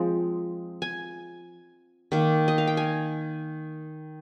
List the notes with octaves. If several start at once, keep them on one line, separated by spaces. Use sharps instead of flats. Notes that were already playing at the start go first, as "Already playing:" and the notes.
Already playing: F3 G#3 C4
G#5
D#3 A#3
D#5
F5
G5
G#5